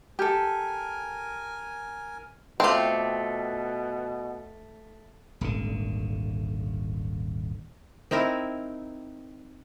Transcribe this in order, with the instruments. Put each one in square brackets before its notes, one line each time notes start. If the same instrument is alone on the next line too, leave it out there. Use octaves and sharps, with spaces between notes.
[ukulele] G4 A4 [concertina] A#4 G#5
[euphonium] B2 [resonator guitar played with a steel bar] A3 [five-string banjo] C4 F4 [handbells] G5 C6 D6
[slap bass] D#1 G#1 D3
[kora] C4 D#4 E4 A#4